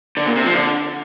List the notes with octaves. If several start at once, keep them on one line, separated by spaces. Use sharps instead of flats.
D3
A#2
C3
F3
D3